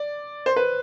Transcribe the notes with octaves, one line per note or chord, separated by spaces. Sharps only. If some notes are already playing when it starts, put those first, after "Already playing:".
Already playing: D5
C5
B4